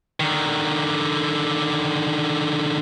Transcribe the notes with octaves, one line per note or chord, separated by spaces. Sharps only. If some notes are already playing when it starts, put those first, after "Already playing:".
D3 D#3